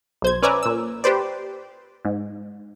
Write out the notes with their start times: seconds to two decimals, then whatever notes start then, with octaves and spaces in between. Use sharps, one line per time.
0.22 B1 C5 G#6
0.43 C#4 B4 D5 E5 G#5 A#5
0.63 A#2 E6
1.04 G4 B4 C5 D5
2.05 G#2